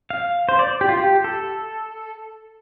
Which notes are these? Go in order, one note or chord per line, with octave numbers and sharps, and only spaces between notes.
F5
C5
D5
G4
F4
G4
A4